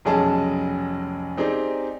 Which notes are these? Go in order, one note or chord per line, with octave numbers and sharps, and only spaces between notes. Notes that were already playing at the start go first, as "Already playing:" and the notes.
F1 B1 C#4 G#4 D#5 A5
C4 D#4 G4 G#4 D5